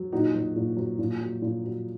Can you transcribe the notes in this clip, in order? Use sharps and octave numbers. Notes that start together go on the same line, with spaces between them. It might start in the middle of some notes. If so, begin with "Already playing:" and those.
Already playing: F#3
A#2 D#4 F#4
F#3
A#2
F#3
A#2
F#3
A#2
F#3